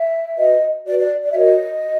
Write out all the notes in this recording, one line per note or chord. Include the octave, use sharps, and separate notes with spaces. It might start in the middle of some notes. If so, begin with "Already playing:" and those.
Already playing: E5
F#4 B4 D#5
F#4 B4 D5
D5
D5
E5
F#4 A#4 C#5 D#5
F#4